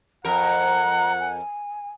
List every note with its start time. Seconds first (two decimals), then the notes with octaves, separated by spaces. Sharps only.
0.25 F2 A#4 F#5 A#5
1.19 G#5